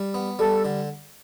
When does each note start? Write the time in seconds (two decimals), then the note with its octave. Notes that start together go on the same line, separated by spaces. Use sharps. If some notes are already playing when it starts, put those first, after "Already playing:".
Already playing: G3
0.14 B3
0.39 G3 A4
0.65 D3